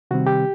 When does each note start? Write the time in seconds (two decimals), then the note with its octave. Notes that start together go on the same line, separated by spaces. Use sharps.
0.11 C3 D#3 G3 C4 F#4
0.27 G4